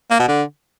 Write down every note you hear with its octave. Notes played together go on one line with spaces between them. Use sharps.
A#3
B2
D3